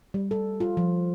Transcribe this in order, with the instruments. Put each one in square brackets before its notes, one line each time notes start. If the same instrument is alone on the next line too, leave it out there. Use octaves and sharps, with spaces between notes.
[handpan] G3
A4
F4
F3